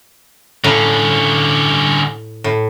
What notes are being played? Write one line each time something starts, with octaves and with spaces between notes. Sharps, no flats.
A2 D3 C#4 F5 A#5
A2